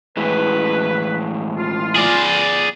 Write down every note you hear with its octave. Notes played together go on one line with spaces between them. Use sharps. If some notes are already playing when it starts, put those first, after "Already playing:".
A2 E3 G#3 B4
F4
G#4 D5